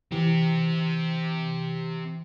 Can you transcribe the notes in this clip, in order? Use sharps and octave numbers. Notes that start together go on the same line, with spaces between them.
E3 C4 G4